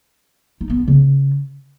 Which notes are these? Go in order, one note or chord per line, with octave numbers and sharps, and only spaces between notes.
D#4
B3
D4
C#3